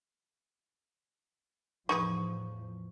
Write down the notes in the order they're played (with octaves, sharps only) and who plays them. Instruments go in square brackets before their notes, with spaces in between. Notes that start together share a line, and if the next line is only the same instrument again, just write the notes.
[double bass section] E2 A2 F3 [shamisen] D#4 G#4 B4 [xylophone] C#6